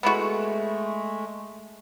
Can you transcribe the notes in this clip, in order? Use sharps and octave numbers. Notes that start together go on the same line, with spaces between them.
G#3 A3 B3 E4 F#4